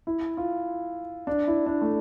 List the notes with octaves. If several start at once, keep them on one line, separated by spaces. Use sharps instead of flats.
E4
F4
D4
E4
D4
A3